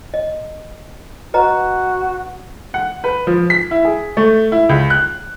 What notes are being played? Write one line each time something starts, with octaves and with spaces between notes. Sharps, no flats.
D#5
F#4 B4 D#5 A#5
F#5
B4
F3
B6
E4
G#4
A3
E4
C#2
F#6